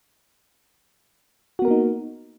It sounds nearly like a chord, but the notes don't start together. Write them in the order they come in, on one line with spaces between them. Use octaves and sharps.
F#4 B3 A#4 A#3 D#4